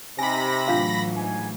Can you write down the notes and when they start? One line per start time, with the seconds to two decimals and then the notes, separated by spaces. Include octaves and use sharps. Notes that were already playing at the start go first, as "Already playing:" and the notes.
0.19 C3 D#4 G#5 B5 A#6
0.68 A2 E3 F#3 D4 F4 F5
1.16 G#2 G#5